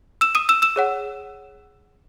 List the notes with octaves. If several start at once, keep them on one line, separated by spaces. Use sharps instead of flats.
E6 E7
D#6 D#7
E6 E7
E6 E7
G#4 C#5 F#5